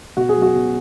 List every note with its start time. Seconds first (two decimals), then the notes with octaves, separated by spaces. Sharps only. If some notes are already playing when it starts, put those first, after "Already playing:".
0.17 B2 F#4
0.29 G#4
0.35 F#3
0.42 F#4
0.55 B2